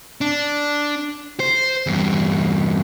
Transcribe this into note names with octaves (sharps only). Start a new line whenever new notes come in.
D4
C5
E2 G2